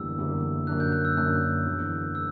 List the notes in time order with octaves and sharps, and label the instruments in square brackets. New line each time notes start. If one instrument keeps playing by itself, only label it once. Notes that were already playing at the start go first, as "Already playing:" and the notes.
Already playing: [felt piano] F#1 E2 D3 G3 A#3 [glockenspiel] E6
[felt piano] F#1 E2 D3 G3 A#3
[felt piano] F#2 D3 A#3 D4 A#4 [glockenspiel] F#6
[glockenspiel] G6
F#6
E6
[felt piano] F#2 D3 A#3 D4 A#4 [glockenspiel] F#6
[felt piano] E1 E2 D3 A#3
[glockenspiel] E6